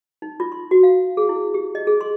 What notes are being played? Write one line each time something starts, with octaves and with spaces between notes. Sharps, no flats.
D#4
F4
C6
F#4
F5
G#4
E4
G4
D#5
G#4
C6